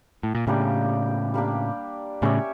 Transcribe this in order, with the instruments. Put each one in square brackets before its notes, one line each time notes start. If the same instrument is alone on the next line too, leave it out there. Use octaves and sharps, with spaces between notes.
[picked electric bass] A2
A#2
[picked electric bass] A2 C#3 [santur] G3 A#3 D4 G4
[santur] G3 A#3 D4 G4
[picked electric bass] A2 C#3 [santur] C#4 G4 C#5 E5